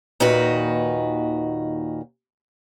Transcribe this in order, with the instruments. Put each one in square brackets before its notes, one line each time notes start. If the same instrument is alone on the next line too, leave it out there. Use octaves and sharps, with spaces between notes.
[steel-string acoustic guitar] D#2 A#2 D#3 D#4 F#4 B4